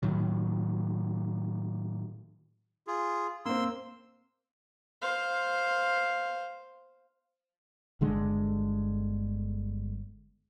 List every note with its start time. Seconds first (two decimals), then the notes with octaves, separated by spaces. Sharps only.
0.03 A2 D#3 F#3
2.87 F4 G#4
3.45 A#3 C4 C6 E6
5.02 C5 F5
8.01 G1 D3 G#3